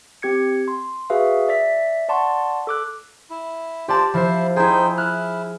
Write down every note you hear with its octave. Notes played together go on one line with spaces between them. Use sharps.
C4 G4 G#6 C#7
C6
F#4 G#4 B4 E5 F5
D5 E5 B6
D5 F#5 A5 C6 C#6
A4 D6 F#6
E4
F4 G4 C5 D5 A5
F3 E4 C5
D#4 E4 G#4 C5 G5
E4 F6 F#6